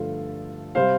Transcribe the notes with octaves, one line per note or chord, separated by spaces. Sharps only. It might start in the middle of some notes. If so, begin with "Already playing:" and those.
Already playing: G2 D3 F3 A3 F4 A4
C3 G3 C5 F5